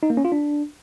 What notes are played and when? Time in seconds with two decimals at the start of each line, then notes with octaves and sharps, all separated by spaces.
0.03 D#4
0.10 A#3
0.17 C#4
0.25 F4
0.32 D4